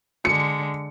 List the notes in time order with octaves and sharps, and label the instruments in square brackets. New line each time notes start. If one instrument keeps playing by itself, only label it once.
[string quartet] D3 G#3 [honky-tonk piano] C#7